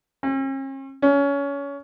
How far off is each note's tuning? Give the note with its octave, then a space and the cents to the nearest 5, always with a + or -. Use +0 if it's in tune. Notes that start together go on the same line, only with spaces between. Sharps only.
C#4 -45
C#4 +25